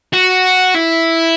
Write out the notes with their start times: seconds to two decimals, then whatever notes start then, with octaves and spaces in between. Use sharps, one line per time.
0.13 F#4
0.75 E4